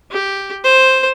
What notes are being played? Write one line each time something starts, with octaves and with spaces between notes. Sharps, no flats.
G4
C5